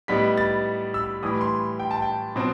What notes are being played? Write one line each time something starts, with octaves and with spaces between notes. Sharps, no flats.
A2 G3 B3 D#4 B6
A6
E6
A2 E3 G3 D#6
C6
G5
A5
G5
B2 F#3 C4